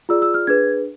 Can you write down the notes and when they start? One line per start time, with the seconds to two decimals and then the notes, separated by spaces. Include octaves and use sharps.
0.09 F4 G#4 D5 E6
0.22 E6
0.34 F6
0.47 D4 G#4 B4 G#6